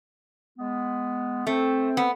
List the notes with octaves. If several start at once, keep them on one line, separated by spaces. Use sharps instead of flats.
G#3 B3
A3 C4
B3